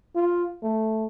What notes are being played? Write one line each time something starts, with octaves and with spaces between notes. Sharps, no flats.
F4
A3